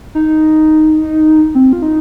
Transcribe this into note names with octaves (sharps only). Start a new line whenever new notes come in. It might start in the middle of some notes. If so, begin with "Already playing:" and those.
D#4
C4
F4
D#4